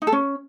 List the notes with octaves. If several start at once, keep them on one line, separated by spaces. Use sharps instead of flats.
D#4
A4
C#4